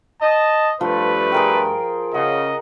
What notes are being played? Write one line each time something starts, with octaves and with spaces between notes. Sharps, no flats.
D#5 A5
G2 F3 A3 B4
G#4 A#4 G5
C#3 D#5 F#5